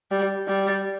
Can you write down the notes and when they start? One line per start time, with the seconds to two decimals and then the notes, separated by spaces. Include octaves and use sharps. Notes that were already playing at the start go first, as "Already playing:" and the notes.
0.11 G3
0.48 G3